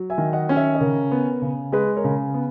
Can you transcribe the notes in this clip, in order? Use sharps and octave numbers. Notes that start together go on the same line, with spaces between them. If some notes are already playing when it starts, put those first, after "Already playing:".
Already playing: F#3
E5 G#5
D#3
D#5 F#5
C#4
C#5 E5
D#5
C#3 A#4 C#5
B3
C#3
G#3 G#4 B4
A#4 C#5
C#3
B3